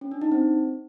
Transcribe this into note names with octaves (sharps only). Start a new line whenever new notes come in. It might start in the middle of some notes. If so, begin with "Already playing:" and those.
C#4
D4
D#4
C4